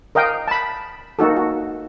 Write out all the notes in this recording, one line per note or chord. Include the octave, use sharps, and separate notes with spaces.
A#4 D#5 F5 G5
A5 B5
A#3 D#4 F#4 A4
F#4